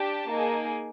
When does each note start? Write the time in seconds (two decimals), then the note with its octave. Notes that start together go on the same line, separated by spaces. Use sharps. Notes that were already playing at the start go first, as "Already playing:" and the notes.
Already playing: D4 G4 A5
0.29 A#3 D#4 G#4